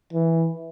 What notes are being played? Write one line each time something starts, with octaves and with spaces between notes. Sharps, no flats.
E3